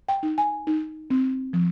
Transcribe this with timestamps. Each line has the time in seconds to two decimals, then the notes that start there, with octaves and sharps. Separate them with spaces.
0.09 G5
0.23 D#4
0.38 G#5
0.67 D#4
1.10 C4
1.53 F3